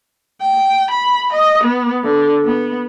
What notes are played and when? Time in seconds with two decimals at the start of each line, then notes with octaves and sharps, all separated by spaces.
0.41 G5
0.91 B5
1.33 D#5
1.63 B3
2.04 D3
2.45 B3